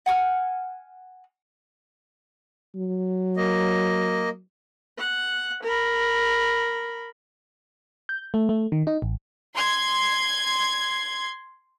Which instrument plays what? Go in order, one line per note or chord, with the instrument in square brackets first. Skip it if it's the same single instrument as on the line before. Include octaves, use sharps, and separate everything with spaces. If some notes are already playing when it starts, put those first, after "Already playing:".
[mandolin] F#5 G#5 D6 F6
[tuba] F#3
[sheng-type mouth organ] A#3 D#5
[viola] F#5
A#4 B5
[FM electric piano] G6
A3
A3
D#3
D#4
A1
[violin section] C6 G#6